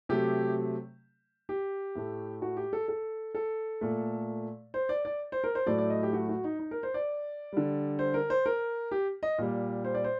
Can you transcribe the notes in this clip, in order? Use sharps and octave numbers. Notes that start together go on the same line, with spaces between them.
C3 F#3 A3 G4
G4
A2 A3
F#4
G4
A4
A4
A4
A#2 A3
C5
D5
D5
C5
A#4
C5
A2 F#3 A3 D5
D5
D#5
G4
F#4
F#4
D#4
D#4
A#4
C5
D5
D3 G3
C5
A#4
C5
A#4
G4
D#5
A#2 G3
C5
D5
C5